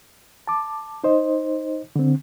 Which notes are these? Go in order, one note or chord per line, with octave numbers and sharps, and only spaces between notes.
A5 D6
D#4 C5 D#5
D3 C4